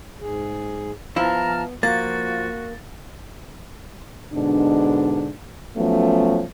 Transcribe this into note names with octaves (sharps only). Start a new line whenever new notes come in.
G#2 G#4
F3 B3 E4 A5 A#5 F6
F3 A#3 F4 F#4 A6
G#2 B2 D3 D4
F3 F#3 A3 B3 C#4